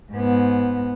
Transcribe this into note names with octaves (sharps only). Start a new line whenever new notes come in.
G#2 B3